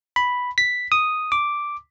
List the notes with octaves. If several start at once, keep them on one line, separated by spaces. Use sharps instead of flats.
B5
B6
D#6
D6